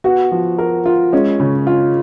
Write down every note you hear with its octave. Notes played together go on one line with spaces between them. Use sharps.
B3 F#4
F3
A#4
F4
G#3 C#4
C#3
F4